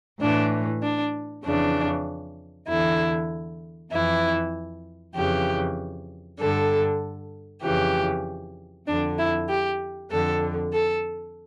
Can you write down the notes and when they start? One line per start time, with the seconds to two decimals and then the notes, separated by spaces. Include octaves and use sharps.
0.21 A2 E3 D4
0.82 D4
1.44 F2 C#3 E3 D4
2.68 E2 D3 E4
3.92 F2 E3 E4
5.15 F2 C#3 E3 G4
6.39 G2 D3 A4
7.63 F2 C#3 E3 G4
8.87 F2 D3 D4
9.18 E4
9.48 G4
10.11 F2 D3 A4
10.73 A4